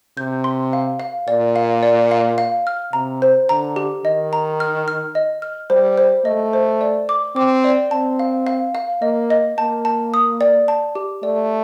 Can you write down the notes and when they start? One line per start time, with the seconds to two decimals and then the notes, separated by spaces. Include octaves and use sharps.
0.17 C3 G6
0.44 C6
0.73 F5
1.00 F5
1.28 A#2 D5
1.56 F5
1.83 D5
2.11 F5
2.38 F5
2.67 F6
2.93 C3 A#5
3.22 C5
3.49 D3 A#5
3.76 G4
4.05 D#3 D#5
4.33 A#5
4.60 F6
4.88 F6
5.15 D#5
5.42 F6
5.70 G3 C5
5.97 C5
6.25 A3 D#5
6.53 C5
6.81 D5
7.09 D6
7.36 C4 D6
7.64 D5
7.91 C4 A5
8.19 F5
8.47 F5
8.75 F5
9.02 A#3 D#5
9.30 D#5
9.58 A#3 A5
9.85 A5
10.14 D#6
10.41 D5
10.68 A5
10.95 G4
11.23 A3 D5